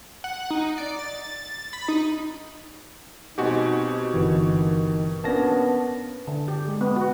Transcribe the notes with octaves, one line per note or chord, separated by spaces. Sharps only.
F#5
D#4
D5
A6
B5
D#4
B2 G3 C4 D#4 F#4 G4 G#5
G1 D#3 E3
A#3 B3 C#4 D4 A5 A#6
D3
G4
G#3
B3
F#4